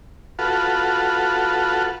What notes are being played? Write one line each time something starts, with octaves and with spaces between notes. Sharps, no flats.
F4 F#4 A4 B4